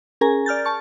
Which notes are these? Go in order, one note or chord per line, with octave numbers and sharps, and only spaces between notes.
C#4 G#4 A#4 G#5 A#5
D5 F6 G6 A6
A5 C#6